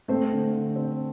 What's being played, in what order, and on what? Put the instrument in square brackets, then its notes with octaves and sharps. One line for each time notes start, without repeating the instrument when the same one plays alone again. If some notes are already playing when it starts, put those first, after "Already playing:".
[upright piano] A3 [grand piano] C4
[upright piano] D3
D3
C4